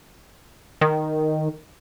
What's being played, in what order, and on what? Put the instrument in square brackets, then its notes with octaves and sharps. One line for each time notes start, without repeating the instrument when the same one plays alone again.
[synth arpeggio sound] D#3